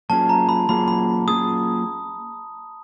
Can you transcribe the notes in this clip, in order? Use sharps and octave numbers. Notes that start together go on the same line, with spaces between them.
F#3 A#3 C#4 F4 G#4 A5
A#5
B5
F#3 A#3 C#4 F4 G#4 B5
B5
F#3 A#3 C#4 F4 G#4 D#6